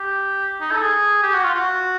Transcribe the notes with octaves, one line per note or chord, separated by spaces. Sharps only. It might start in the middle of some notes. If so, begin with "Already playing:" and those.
Already playing: G4
D#4
A4
G#4
G4
F#4
F4
F#4